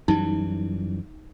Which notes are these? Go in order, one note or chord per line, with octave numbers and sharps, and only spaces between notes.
F#2 E3 G3 D#4